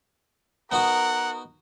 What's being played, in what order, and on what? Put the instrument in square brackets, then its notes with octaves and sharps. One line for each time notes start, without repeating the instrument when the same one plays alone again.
[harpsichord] B3 D#4 F#4 [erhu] A#4 [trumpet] F#5